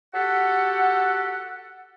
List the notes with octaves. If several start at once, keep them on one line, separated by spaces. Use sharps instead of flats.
F#4 G4 A4 F#5